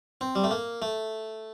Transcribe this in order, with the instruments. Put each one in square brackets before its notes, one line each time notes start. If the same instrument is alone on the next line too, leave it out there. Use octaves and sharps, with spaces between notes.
[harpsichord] C4
G3
A3
A#3
A3